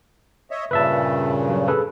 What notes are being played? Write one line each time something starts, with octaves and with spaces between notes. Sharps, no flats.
C#5 D#5 E5
G2 A#2 C#3 B4 E5 A5
F#3
G#4 A4 B4